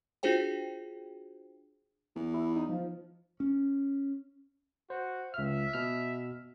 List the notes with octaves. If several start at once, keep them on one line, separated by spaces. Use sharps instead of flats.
D4 F4 F#4 G#4 C5 G5
E2
E4
D#4
F3
C#4
F#4 C5
C#2 E5 F6
B2 F6